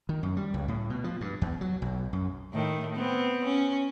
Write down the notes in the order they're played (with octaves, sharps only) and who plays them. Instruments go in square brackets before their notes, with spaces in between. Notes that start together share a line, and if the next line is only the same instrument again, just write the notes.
[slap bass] D#3
F#2
G3
C#2
A2
B2
F3
G2
E2
F#3
B1
F#2
[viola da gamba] A2 D#3
B3 C4
C#4